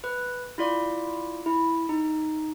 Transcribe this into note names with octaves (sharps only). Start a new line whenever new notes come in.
B4
E4 F4 D5
E4
D#4